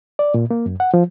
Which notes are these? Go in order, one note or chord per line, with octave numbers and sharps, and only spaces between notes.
D5
A#2
A#3
F#2
F#5
F3